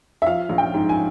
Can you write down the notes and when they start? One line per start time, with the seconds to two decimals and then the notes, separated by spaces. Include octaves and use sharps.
0.22 E5
0.26 F3 F5
0.49 A#1
0.58 G5
0.74 G#2
0.89 G#5